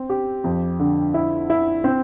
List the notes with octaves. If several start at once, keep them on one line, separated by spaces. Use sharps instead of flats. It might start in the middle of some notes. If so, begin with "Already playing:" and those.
Already playing: C4
G4
F2
D3
E4
E4
C4